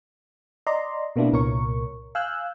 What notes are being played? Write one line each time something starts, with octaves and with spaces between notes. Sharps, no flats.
D5 D#5 A#5 C6
B2 A#3 B3 D4 E4 F#4
C2 A#2 A#4 C#5 C#6
F5 G#5 E6 F#6 G6